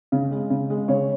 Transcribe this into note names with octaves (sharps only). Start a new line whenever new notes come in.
C#3
G#3
C#3
G#3
C#3 C#5